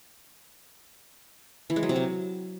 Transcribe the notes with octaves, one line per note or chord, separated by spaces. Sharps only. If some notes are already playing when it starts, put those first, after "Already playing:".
E3
G#3
F#3
C3
F#3